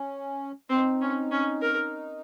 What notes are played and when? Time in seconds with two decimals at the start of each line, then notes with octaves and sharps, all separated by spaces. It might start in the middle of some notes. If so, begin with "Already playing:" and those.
Already playing: C#4
0.69 C4 D#4
1.01 C#4
1.31 C#4
1.62 A#4